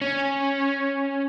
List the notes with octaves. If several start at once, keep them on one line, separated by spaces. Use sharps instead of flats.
C#4